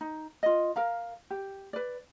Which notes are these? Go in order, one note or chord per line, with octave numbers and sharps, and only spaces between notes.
D#4
F4 D#5
A#4 F5 A#5
G4
B4 D5